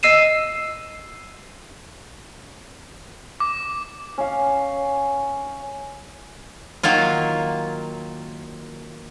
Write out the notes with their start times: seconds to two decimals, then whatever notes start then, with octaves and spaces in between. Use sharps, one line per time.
0.03 D#5 E6 C7 D#7 E7
3.40 D6
4.18 C#4 F5
6.83 D#3 F#3 A#3 F4